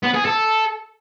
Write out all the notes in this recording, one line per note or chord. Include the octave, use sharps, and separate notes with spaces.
B3
G#4
A4